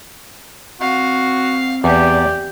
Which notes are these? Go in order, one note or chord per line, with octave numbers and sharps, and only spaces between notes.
C4 F#4 F5
E2 G4 D5